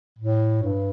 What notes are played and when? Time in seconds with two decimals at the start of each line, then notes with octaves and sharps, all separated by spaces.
0.19 A2
0.63 G2